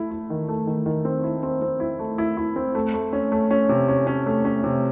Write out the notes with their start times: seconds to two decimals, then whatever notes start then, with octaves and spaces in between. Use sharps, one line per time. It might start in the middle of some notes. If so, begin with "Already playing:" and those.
Already playing: A3 E4
0.11 E4
0.30 D#3
0.49 A3
0.67 D#3
0.86 D#3
1.05 C4
1.24 E4
1.43 C4
1.62 C4
1.80 E4
1.99 A3
2.18 E4
2.37 E4
2.56 C4
2.75 A3
2.94 A3
3.13 C#4
3.32 A3
3.51 C#4
3.69 C3
3.88 C#4
4.07 C#4
4.26 A3
4.45 C#4
4.64 C3